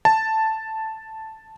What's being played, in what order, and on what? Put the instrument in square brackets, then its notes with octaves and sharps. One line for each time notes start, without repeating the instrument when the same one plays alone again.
[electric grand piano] A5